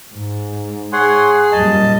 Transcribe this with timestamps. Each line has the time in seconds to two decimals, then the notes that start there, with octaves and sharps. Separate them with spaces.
0.10 G#2
0.93 G#4 C#5 F#5 C6
1.52 F#2 A#2 G3 D#5 A5